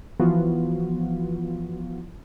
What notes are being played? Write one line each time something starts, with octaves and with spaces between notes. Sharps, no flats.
E3 F3 B3 F4 F#4